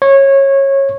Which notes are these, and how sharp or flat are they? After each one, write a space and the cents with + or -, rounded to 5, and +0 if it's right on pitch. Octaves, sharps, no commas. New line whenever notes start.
C#5 -20